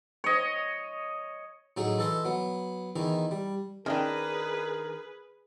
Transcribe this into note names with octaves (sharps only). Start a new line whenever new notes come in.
C#5 D#5
A2 F#3 D#4 G#4
E3 A4 D#5 C6
F#3 B3
E2 D#3 E3 D#4
G3
D#3 C#4 D4 G#4 A#4 B4 D#5 G5